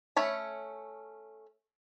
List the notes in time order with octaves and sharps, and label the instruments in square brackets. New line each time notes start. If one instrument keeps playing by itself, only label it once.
[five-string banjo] A3 C#4 C#5 B5